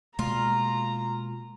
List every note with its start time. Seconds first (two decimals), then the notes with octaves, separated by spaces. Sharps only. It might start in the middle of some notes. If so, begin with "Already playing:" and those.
0.19 B2 G#3 A#3 F4 A#5